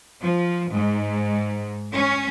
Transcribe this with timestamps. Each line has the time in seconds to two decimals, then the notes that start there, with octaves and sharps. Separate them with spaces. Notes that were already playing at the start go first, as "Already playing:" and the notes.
0.21 F3
0.73 G#2
1.93 C#4